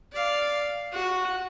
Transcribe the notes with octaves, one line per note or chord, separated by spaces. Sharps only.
D5 F5
F#4